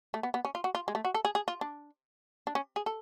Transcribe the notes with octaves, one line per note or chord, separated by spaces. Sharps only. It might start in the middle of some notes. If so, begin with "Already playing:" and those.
A3
B3
B3
C#4
F4
F#4
F4
G#3
A3
F#4
A4
G#4
G#4
F4
D4
D4
C#4
G#4
A4